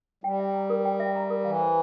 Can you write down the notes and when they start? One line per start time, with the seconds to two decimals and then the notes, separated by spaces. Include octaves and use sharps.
0.24 G3 G5
0.39 E5
0.54 A#5
0.70 A#4
0.85 G5
1.00 E5
1.15 A#5
1.30 A#4
1.44 E3 F5
1.60 C5